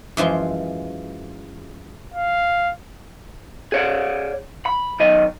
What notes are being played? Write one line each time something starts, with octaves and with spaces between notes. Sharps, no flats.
F#2 E3 F3 G#3 C6
F5
G#4 C#5 D5
B5
B1 D#3 D#5